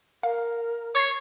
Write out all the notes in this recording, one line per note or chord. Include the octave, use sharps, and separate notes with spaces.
A#4 F5
C#5 C#6 G#6 C7